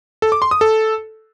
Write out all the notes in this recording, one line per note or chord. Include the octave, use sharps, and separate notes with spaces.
A4
D6
C6
D#6
A4